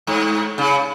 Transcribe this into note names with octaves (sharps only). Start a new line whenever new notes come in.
G#2
C#3